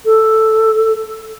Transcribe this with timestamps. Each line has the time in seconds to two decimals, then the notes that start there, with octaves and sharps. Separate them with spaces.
0.05 A4